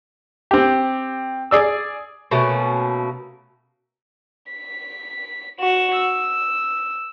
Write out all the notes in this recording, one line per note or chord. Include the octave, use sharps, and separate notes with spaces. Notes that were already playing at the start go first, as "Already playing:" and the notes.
C4 G4
G#4 D5 E6
B2 A3 A#3 C#4
B6
F#4 E7
E6